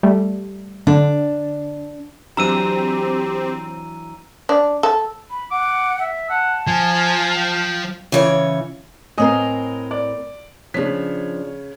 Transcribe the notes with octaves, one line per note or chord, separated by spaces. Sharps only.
G3 A3
D3 D4
E3 F#3 C4 D4 G4 A#5 E6 D#7
D4
A4
B5
F#5 D6
E5
F#5 A5
F3 G#5
G5
C#3 E3 C#5
A2 C4 A#4 D#5 G#5 D#6
D5
C#3 F3 D4 C#5 B6